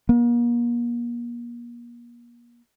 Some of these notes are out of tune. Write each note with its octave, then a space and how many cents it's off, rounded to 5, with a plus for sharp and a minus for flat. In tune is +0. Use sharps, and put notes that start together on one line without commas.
A#3 +40